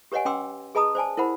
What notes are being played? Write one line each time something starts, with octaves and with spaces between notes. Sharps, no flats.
G4 B4 C#5 D#5 F#5 G#5
C#4 B4 G5 C6 D6 E6
G#4 B4 D#5 A5 A#5 D#6
C5 D5 G#5 A5
E4 A#4 C5 F#5 B5